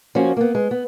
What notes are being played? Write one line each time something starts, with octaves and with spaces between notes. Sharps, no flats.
F3 A#3 C#4 F#4
A#3 B3
G#3
B3